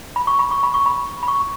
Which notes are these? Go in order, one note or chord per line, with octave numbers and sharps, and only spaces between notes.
B5
C#6
B5
C#6
B5
C#6
B5
B5
C#6